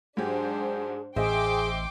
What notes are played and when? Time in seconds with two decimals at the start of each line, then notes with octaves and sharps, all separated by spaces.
0.17 G#2 F#3 D4 G4 G#4 C5
1.16 A1 G#4 C5 D#5 E5 G5 C6 D6